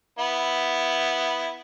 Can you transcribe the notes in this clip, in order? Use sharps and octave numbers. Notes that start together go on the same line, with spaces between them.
B3 E4